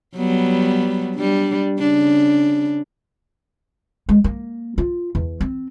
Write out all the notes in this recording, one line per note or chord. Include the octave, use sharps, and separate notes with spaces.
F#3 G3 B3
G3 D4
C#3 D4
G#3
A#3
F4
E2
C4